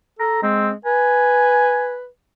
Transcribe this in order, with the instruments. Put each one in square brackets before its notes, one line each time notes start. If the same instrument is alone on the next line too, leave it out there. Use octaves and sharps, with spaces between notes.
[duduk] A4 [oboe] A#5
[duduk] G#3 [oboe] C4
[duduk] B4 [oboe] G#5